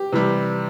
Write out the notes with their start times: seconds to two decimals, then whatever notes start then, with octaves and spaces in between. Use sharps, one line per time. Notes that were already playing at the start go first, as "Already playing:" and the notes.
Already playing: G4
0.12 C3 E3 G3